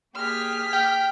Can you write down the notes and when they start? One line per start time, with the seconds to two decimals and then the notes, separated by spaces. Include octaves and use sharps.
0.15 A#3 G4 G#4 F6 B6
0.73 G5